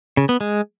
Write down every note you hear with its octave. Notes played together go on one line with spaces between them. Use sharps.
C#3
B3
G#3